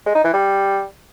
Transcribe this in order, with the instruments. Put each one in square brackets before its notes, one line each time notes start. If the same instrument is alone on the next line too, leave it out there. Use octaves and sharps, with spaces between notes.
[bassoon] G#3
D#4
E3
G3